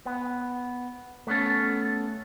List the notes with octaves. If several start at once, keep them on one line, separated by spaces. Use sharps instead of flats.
B3
A3 B3 C#4 A4